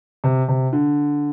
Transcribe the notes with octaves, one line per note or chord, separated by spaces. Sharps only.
C3
C3
D3